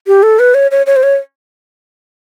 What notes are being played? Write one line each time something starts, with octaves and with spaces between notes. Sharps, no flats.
G4
A4
B4
C#5
C#5
C#5
C5
C#5